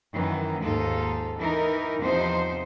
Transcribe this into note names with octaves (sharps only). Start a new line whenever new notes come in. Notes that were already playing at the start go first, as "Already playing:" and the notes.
F#2 D#3 E3
D#2 G#2 D#4 F4 A4
E3 D#4 A#4
E2 C3 F3 D#4 C5